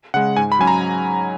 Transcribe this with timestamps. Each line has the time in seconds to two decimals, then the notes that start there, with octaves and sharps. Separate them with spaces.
0.14 C#3 G#3 F#5
0.36 G#2 G#5
0.52 B5
0.59 F#3 C#4 G#5
0.67 A#5